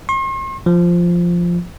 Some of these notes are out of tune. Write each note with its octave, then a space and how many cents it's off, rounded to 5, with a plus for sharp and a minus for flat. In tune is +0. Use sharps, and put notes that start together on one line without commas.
C6 +45
F3 -5